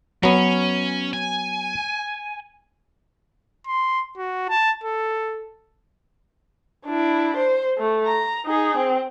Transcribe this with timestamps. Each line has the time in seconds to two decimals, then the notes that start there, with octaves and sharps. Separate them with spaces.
0.23 F#3 B3 C#4
1.13 G#5
3.67 C6
4.18 F#4
4.49 A5
4.84 A4
6.86 D4 E4
7.37 C5
7.78 A3
8.06 A#5
8.46 D#4 G#4
8.77 C4